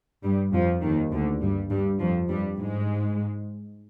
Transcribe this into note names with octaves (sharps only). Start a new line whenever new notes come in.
G2 G3
F2 F3
D#2 D#3
D2 D3
G2 G3
G2 G3
F2 F3
G2 G3
G#2 G#3